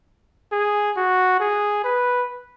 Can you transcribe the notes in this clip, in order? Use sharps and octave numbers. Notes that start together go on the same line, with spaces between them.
G#4
F#4
G#4
B4